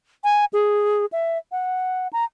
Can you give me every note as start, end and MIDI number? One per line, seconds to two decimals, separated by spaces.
0.24 0.45 80
0.53 1.06 68
1.12 1.38 76
1.52 2.08 78
2.13 2.25 82